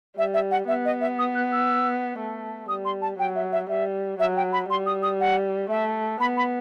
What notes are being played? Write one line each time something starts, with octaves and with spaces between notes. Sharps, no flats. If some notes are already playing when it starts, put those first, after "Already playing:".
G3 E5
E5
F#5
B3 E5
D#5
E5
D#6
F#6
E6
A3
G3 D#6
C6
A5
F#3 G5
E5
E5
G3 E5
F#3 E5
G5
B5
G3 C6
D#6
D#6
F#5
A3 E5
B3 B5
B5